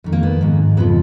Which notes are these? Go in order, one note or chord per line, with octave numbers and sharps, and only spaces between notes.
F2 D#3
A#3
B3
G#2 D#3
F2 C#3 F3 B3